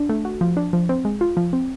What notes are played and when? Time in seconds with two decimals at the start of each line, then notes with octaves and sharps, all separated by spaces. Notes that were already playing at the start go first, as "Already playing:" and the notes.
Already playing: D4
0.09 A3
0.25 F#4
0.41 F3
0.57 D4
0.73 F3
0.89 C4
1.05 G#3
1.21 F4
1.37 F3
1.53 C4